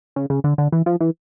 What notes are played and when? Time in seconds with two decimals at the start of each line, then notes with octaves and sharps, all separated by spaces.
0.16 C#3
0.30 C#3
0.44 D3
0.58 D3
0.72 E3
0.86 F3
1.00 E3